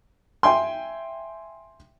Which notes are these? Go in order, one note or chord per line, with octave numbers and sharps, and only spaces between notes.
E5 G5 G#5 C6